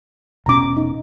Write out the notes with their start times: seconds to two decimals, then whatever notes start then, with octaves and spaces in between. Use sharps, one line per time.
0.46 E1 B2 C#4 A#5 D6
0.77 D#4